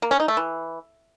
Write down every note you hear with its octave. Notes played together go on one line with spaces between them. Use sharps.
A#3
C#4
D#4
A3
E3